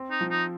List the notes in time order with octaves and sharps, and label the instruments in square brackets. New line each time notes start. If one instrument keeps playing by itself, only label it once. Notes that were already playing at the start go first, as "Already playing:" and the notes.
Already playing: [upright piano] C4
[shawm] D#4
[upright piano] F3
[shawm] D#4